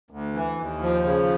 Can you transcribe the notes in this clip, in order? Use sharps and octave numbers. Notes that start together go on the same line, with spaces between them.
D2
E3
D#2
F3
C#3